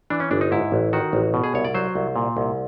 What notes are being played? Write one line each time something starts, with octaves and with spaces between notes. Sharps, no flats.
E3 D4
C#4
G1 D4
D#4
G#2 E4
A1
D#3 F#4
A1
B2
G#4
C2 C#5
D5
F#3 C5
C2
A#2
C2